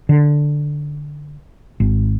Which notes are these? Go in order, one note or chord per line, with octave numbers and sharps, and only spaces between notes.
D3
G#1